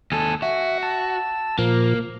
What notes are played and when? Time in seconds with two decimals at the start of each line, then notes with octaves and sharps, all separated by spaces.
0.12 D#2 A4 G#5 D#6
0.42 F#4 E5
0.83 A5 E6
1.59 A#2 F3 A#3